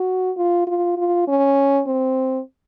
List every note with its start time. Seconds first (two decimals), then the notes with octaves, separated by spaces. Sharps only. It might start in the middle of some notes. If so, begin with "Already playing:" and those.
Already playing: F#4
0.37 F4
0.67 F4
0.97 F4
1.28 C#4
1.87 C4